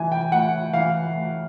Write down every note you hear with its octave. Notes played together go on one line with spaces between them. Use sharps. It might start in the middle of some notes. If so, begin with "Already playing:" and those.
Already playing: E3 G#5
G5
A2 F#5
E3 F5
A2